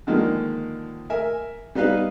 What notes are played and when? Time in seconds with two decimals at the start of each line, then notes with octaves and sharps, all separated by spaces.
0.07 D3 D#3 F3 G#3 A#3
1.10 A#4 E5 G#5
1.75 G3 B3 D#4 B4 F5